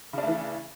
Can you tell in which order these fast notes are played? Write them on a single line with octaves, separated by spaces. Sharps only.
C#3 D4 A3 E3